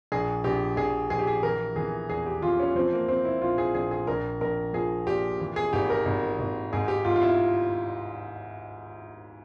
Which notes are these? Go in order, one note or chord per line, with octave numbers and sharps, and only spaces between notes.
A#1 G#4
A#1 G4
A#1 G#4
A#1 G#4
G4
G#4
E3 A#4
E3 G#4
E2 G#4
G4
E3 F4
C#4
F3 C4
A#3
F3 C4
E4
A#1 F4
G#4
A#1 G#4
G#4
A#1 A#4
A#1 A#4
F3 G#4
A#2 G4
E3
G#4
G#1 G4
A#4
G#1
G#1
G#2 G#4
G4
G#2 F4
F4
E4